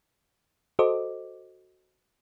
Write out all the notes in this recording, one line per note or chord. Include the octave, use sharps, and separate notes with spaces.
F#4 A4 C5 D#5 D6